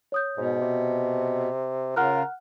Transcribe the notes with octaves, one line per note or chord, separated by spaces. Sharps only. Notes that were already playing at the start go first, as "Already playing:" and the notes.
C#5 D#6 G6
G#2 B2
C3
C#3 F4 A#4 F#5 F6 F#6